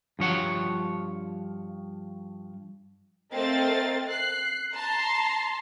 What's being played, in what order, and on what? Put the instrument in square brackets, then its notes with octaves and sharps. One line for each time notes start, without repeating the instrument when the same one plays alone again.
[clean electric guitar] G2 F3 C#5 F#5
[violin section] A3 C4 A#4 D#5 F5 A6
F#6 C7
A5 A#5 C6